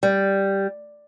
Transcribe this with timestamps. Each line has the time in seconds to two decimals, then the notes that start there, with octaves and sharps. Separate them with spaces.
0.03 G3